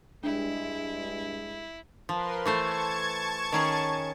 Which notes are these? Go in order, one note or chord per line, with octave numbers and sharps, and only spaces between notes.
G2 G#3 D4 E4
F3 A#4 B4 C6
E3 A3 C5 A5 C#6 G#6
D#3 C#4 G#4